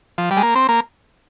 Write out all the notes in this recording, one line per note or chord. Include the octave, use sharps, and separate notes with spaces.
F3
G3
G#3
A#3
C4
A#3